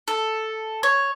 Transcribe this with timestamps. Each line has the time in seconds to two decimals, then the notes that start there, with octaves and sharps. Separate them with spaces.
0.08 A4
0.83 C#5